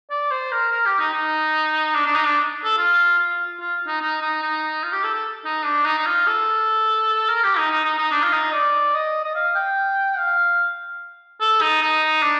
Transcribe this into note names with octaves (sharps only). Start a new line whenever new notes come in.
D5
C5
A#4
A#4
G4
D#4
D#4
D4
D4
D#4
D4
A4
F4
F4
F4
D#4
D#4
D#4
D#4
F4
G4
A4
A4
D#4
D4
D#4
D#4
F4
A4
A#4
G4
D#4
D#4
D#4
D#4
D4
F4
D#4
D#5
D5
D#5
D#5
F5
G5
F5
A4
D#4
D#4
D4